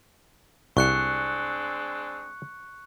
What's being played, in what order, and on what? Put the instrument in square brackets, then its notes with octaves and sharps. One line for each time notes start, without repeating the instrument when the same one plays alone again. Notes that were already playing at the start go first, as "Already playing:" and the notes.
[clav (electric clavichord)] C2 [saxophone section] G#3 C4 D4 [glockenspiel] C#6 F#6 C#7